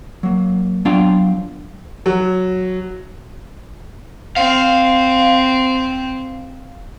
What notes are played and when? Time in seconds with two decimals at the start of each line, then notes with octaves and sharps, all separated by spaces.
0.23 F#3 A#3
0.85 F#3 B3 D4 F4 F5 G5
2.06 F#3
4.36 C4 F5